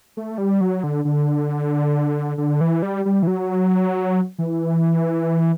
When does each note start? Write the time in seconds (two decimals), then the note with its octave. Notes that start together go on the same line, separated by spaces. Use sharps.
0.17 A3
0.38 G3
0.61 F#3
0.84 D3
1.05 D3
2.38 D3
2.61 E3
2.82 G3
3.05 G3
3.23 E3
3.27 F#3
4.38 E3